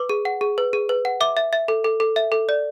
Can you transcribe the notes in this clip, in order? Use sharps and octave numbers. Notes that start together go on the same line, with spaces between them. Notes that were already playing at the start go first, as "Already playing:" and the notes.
Already playing: B4 D6
G#4
F#5
G#4
B4
G#4
B4
F#5
E5 D6
E5
E5
A4
A4
A4
E5
A4
D5